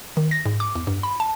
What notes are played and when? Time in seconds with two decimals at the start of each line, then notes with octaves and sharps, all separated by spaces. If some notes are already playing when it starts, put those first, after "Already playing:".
0.17 D#3
0.31 A#6
0.46 G#2
0.60 D6
0.75 E2
0.87 G2
1.03 B5
1.20 A5